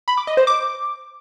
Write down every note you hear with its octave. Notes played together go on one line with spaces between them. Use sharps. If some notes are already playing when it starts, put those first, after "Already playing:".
B5
D6
D#5
C5
D6